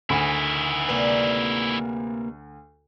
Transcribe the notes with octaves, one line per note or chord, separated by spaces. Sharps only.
D2 D#3 E4 G#5 B5
C3 A#3 D4 B4